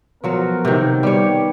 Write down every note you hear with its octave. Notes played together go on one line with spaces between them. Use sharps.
F3 F#3 B3 F#4 A#4
C3 D#3
G3 B3 G4 C#5